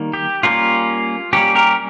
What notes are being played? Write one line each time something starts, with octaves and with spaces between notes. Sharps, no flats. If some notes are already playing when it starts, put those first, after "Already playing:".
Already playing: D#3 G3 A#3
G4
G3 A#3 C#4 F4
G3 A#3 C#4 G4
G4 A#4